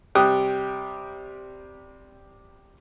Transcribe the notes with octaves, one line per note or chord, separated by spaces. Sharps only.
C3 G3 G5 D#6 F#6